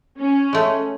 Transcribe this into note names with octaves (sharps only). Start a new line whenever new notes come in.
C#4
G#3 A3